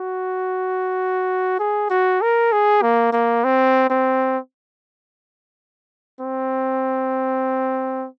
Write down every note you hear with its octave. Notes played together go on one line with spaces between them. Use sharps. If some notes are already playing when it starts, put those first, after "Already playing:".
Already playing: F#4
G#4
F#4
A#4
G#4
A#3
A#3
C4
C4
C4